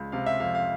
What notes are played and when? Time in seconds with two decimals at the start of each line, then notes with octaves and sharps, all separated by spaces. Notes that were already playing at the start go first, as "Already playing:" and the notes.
Already playing: C#2
0.12 C3 F5
0.26 E5
0.40 F2 F5
0.55 F5